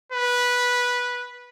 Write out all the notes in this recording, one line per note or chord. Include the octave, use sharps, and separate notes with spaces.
B4